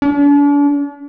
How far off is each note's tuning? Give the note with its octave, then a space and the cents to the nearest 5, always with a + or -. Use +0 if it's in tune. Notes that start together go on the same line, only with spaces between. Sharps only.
D4 -40